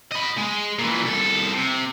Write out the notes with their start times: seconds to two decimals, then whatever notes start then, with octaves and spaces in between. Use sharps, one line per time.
0.12 D#5 B5
0.38 G#3
0.79 A#2 E3
1.02 C2 A4
1.52 C3